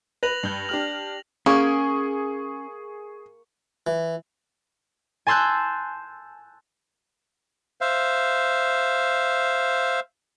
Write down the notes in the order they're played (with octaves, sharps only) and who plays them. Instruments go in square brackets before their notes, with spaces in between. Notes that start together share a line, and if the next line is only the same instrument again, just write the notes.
[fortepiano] B4 [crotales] A#6 F7 F#7
[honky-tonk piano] G2 G6
[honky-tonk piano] D4 G4 F6 [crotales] F#7
[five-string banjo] A#3 [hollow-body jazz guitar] C#4 [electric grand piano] G#4 [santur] C#6
[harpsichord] E3
[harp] G#5 A5 C6 E6 F#6 G6
[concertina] C5 E5 F5